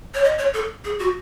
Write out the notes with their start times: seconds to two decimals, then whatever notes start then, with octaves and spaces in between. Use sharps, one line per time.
0.14 C#5
0.24 D#5
0.38 C#5
0.54 A4
0.84 G#4
0.99 F#4